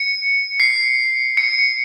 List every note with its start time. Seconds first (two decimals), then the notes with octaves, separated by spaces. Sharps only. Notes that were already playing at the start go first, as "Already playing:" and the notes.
Already playing: C#7
0.60 C7
1.37 C#7